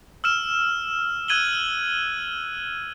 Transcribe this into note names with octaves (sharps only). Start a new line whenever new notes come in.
E6 F6 E7
E6 F#6 G#6 D#7 F#7 G7